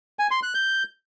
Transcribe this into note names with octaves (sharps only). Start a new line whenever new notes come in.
G#5
C6
F#6
G6